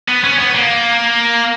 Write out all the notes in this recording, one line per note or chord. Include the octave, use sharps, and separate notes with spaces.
B3
C#4
B3
A#3